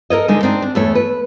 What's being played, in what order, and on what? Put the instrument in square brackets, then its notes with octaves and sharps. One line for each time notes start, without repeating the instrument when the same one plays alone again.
[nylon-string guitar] A4 A#4 C#5 D#5
D3 G#3 D#4
C4 D4 D#4
D4
E2 A3 C#5
B4